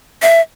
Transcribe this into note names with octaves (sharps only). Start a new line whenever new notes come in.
E5